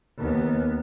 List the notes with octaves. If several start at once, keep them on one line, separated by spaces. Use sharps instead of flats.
D#2 B3